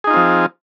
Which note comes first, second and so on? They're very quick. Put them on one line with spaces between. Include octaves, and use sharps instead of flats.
G#4 D#4 F4 C4 F3